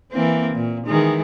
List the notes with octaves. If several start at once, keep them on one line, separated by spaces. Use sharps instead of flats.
E3 A#3 C4
A#2
D#3 E3 G#3